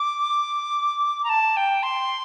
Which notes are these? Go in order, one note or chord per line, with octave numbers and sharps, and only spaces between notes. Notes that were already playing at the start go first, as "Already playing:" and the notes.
Already playing: D6
A#5
A5
G5
C6